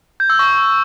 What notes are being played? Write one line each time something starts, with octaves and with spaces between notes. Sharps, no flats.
G6
E6
C#6